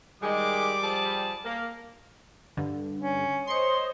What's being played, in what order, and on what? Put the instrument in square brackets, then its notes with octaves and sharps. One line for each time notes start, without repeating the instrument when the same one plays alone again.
[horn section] D#3 G#3 [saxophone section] G3 [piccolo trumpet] D6
[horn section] F3 G#4 A5
A#3
[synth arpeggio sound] G2 D3
[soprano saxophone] C#4
[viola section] C5 C#5 D#5 [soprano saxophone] C6 [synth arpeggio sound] C7 C#7